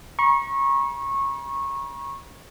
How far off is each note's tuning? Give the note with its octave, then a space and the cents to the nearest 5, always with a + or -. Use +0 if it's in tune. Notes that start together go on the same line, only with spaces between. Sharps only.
A#5 +45 C#6 -20